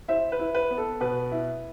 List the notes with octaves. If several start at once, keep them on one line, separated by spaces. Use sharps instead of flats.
E4 C5 E5
B4
E4
B4
B3
A4
B2 B4
E4